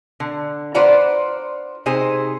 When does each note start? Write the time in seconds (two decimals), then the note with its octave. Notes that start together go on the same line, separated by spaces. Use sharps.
0.20 D3
0.75 F4 B4 C5 D5 F#5 A#5
1.86 C3 D#4 G#4 C5